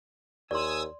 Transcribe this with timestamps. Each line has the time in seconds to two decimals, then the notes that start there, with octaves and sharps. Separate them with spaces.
0.51 D#2 D5 G#5 C6 D#6 E6